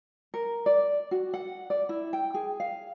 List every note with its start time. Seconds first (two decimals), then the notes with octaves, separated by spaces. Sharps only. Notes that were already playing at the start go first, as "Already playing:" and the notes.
0.34 A#4
0.66 D5
1.11 F#4
1.34 F#5
1.70 D5
1.89 E4
2.13 G5
2.34 G#4
2.60 F5